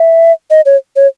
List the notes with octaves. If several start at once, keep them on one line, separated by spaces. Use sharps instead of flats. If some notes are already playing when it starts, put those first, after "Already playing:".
Already playing: E5
D#5
C#5
C#5